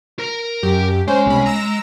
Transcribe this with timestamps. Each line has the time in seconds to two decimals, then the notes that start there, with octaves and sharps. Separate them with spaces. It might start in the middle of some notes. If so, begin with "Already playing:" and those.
0.19 A#4 A#5
0.63 F#2 G4
1.08 G#3 C#4 C5
1.26 C2 B2 B5
1.46 A#5 E6 A#6